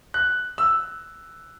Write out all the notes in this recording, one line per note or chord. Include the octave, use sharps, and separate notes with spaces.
F#6
E6